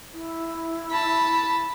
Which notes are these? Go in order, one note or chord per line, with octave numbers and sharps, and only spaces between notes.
E4
A5 B5